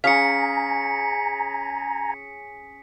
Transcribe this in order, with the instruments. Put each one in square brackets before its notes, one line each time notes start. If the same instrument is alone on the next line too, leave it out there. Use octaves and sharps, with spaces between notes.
[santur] C#4 G#4 [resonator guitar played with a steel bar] F5 [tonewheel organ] G#5 A#5 [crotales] B6 C#7